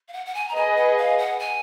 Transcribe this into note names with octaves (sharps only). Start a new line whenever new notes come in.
F5
F#5
F#5
G#5
A#5
G#4 B4 D#5 G#5
F#5
F5
F#5
G#5